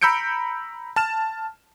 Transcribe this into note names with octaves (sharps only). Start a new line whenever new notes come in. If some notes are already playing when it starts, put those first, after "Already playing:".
A#5 B5 E6 G6 C#7 D7
A5 F6 E7